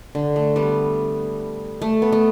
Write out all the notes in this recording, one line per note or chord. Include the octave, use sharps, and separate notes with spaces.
D3
A3
G3 B3
A3
B3
A3